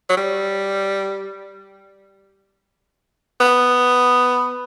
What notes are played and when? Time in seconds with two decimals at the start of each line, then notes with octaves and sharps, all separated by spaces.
0.09 F#3
0.17 G3
3.41 B3